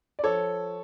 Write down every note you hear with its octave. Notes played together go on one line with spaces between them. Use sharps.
D5
F3 A4 C#5